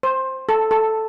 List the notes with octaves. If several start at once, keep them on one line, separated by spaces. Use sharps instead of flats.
C5
A4
A4